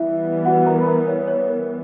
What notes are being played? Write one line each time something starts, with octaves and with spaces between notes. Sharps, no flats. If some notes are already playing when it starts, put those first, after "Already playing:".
Already playing: E3 G3 B3 E4 E5
F#4 F#5
A#4 A#5
B5
A#4 A#5
C#5
B4
C#5
A#4